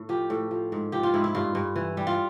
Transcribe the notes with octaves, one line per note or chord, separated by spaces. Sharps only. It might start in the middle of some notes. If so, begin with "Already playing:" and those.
Already playing: A2
F3 G4
A2
F3
G#2
F3 G4
F4
G#2 E4
E4
G2 F4
G2
E3
G3
F4